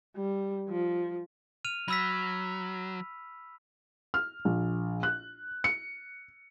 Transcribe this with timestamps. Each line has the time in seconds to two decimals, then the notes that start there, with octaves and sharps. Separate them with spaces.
0.16 G3
0.69 F3
1.65 F6 D#7 F7
1.88 F#3 B5 E6 B6
4.14 F6
4.45 A#1
5.03 F#6
5.64 C#7